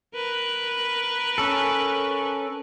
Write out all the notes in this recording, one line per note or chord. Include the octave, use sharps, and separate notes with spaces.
A#4 B4
C#4 A4